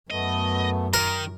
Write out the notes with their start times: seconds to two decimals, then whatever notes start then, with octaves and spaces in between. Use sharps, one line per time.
0.10 F#2 A3 B3 D#5
0.94 D#3 A#4